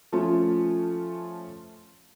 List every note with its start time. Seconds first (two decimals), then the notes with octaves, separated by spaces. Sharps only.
0.12 F3 A3 C#4 F4